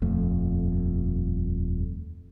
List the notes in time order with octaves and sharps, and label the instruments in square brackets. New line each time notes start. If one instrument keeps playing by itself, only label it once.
[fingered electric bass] D#1 F2 A3